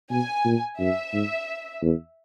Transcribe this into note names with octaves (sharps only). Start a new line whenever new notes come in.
B2 G#5
A#2
F#2 E5
G#2
E2